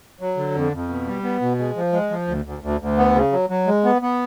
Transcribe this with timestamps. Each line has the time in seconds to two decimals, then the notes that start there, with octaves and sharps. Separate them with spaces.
0.20 F#3
0.37 D3
0.55 F2
0.73 F2
0.89 B2
1.07 G3
1.23 B3
1.41 B2
1.59 G#3
1.76 F3
1.93 G#3
2.11 F3
2.28 D2
2.45 D2
2.62 D2
2.81 D2
2.98 B3
3.15 C#3
3.32 F#3
3.50 F#3
3.67 G#3
3.85 B3
4.02 B3